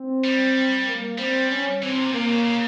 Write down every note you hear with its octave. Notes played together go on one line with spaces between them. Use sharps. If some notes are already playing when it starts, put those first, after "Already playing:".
Already playing: C4
G3
A#3
G3 C4
C#4
E3 C4
C3
A#2
C3 A#3
C#3
C#3